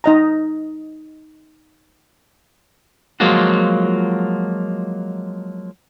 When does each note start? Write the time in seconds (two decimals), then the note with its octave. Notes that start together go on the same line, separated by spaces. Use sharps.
0.04 D#4 D#5 A#5
3.20 F3 F#3 G#3 A#3 F4 F#4